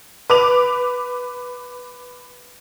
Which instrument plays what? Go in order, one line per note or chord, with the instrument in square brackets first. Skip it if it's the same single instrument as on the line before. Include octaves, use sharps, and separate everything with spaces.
[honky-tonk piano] B4 D6 F7